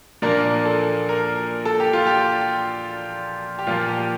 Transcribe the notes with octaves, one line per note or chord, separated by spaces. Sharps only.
A#2 F3 A#3 D4 A#4
A4
A#4
A4
G4
F4
G4
G4
A#2 F3 A#3 F4
G4